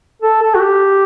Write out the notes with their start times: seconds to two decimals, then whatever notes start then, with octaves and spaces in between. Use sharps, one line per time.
0.22 A4
0.42 A4
0.55 F#4
0.61 G4